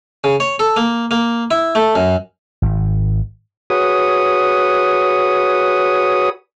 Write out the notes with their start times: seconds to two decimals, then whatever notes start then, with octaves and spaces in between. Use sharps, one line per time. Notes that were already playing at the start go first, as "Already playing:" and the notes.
0.24 C#3
0.40 C#5
0.59 A4
0.76 A#3
1.11 A#3
1.51 E4
1.75 A3
1.95 F#2
2.62 G#1
3.70 F#4 G#4 B4 C#5 D#6